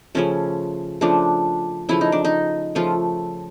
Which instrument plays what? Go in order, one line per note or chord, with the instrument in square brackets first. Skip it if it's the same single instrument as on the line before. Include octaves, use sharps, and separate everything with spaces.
[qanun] C#3 F3 A3 C#4
C#3 F3 A3 D4
C#3 F3 A3 E4
D#4
D4
D#4
C#3 F3 A3 F4